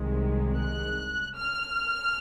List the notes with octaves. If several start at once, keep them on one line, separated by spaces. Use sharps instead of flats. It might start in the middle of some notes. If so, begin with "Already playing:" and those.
Already playing: C2 C3 D#3 G#3
F#6
F6